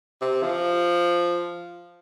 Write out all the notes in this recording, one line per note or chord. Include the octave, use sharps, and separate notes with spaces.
C3
F3